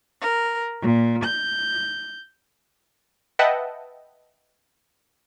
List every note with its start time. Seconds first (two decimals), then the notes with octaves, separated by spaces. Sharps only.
0.21 A#4
0.82 A#2
1.24 G6
3.39 B4 D#5 E5 F#5 G5 A5